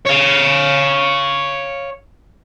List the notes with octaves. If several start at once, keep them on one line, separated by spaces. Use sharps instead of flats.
C#5 F5